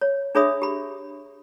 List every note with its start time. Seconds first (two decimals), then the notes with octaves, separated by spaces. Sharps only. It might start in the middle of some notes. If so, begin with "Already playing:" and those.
0.01 C#5
0.35 D4 G#4 C#5 E5 B5 D#6
0.62 G4 B5